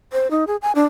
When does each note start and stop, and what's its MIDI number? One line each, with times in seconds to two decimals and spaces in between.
0.13 0.30 72
0.31 0.44 63
0.47 0.56 68
0.62 0.72 80
0.75 0.85 62